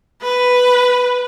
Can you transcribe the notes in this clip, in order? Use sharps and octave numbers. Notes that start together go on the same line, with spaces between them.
B4